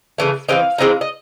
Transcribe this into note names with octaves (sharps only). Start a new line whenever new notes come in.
C#3 E3 A3
E3 G#3 C4 D#4 F5
E3 G#3 C4 D#4
D#5